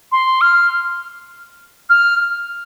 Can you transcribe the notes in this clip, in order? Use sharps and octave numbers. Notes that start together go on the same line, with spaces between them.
C6
F6
F6